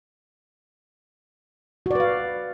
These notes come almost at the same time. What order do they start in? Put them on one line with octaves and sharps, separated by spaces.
F#4 D5 B4 F5